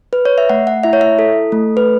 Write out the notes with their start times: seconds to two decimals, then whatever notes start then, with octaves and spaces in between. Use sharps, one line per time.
0.13 B4
0.25 C#5
0.38 E5
0.50 A3 F#5
0.67 F#5
0.83 E4 E5
0.93 C#5
1.01 E5
1.19 A4
1.52 A3
1.77 B4